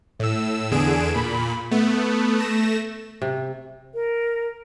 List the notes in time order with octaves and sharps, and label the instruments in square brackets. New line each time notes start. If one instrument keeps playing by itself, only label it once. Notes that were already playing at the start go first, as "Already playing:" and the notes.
[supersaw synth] A2 E6
E2 D3 G#4 D7 E7
A#2 B5
A3 B3
A3 A#6 E7
[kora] C3
[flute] A#4